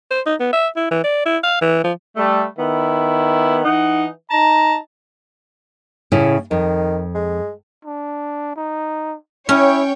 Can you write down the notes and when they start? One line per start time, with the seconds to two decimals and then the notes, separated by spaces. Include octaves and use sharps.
0.11 C5
0.26 D#4
0.40 B3
0.53 E5
0.76 E4
0.91 E3
1.04 D5
1.25 E4
1.43 F5
1.61 E3
1.84 F3
2.17 G3 A3
2.58 D#3 B3 E4
3.65 E3 D#4 F#5
4.31 D#4 A5 A#5
6.12 A2 C#3 C#4 E4
6.51 F2 D#3
7.15 G#3
7.85 D4
8.56 D#4
9.49 C#4 E4 C#5 G5